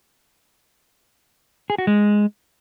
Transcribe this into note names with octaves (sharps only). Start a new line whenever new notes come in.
G#4
F#4
G#3